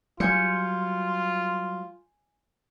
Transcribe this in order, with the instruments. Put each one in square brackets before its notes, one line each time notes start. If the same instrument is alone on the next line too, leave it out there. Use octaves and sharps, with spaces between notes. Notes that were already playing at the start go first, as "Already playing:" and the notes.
[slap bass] F#3 G3 [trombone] F4 [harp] G#5 G6 C#7